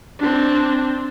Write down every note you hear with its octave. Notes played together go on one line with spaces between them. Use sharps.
C4 D4